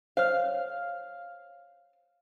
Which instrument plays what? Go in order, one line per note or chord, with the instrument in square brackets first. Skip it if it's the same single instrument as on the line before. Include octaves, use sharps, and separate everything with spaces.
[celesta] C5 C#5 F6 [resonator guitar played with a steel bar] F5